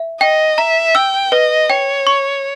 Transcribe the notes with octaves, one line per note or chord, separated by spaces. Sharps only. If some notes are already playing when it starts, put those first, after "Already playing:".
Already playing: E5
D#5 G5
E5 A#5
G5 E6
B4 D#5
C#5 G5
C#6